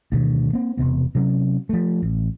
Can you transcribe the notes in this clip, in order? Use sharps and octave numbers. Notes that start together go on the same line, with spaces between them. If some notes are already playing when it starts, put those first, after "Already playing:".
D2 B2 D#3
A#3 C4
E1 A2 C3 B3
C3 F#3 C#4
F3 A3
A1